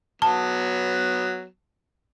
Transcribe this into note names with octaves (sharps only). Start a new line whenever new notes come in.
F#3 B3 A5